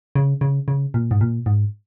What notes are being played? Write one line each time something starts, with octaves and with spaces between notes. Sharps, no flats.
C#3
C#3
C#3
A#2
G#2
A#2
G#2